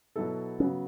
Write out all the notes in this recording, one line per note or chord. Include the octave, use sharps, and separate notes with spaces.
B2 F#3 B3 E4 A4
C#3 F#3 B3 C#4